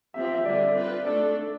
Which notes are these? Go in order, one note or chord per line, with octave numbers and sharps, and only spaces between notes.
F3 C4 G4 E5
E5
E5
D3 G3 D4 D5
C4 F4 B4
A3 D4 A4 D5